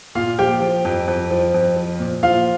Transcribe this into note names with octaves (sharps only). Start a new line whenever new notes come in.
A#2 F4 F5
F3 G4 G5
F3
F2
F2
F3
F2
F3
A#2
F3 F4 F5